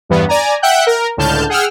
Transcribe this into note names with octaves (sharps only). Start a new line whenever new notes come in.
E2 G2 E3 B3
D5 G#5 A#5
E5 F#5 G5 F#6 G6
A#4
C#2 A2 D3 A5 F6 G6
G#4 F#5 G5 E6 F6